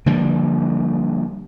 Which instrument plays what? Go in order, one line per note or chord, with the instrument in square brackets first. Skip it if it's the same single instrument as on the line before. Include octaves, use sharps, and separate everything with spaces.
[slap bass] D3 F3 G3 A#3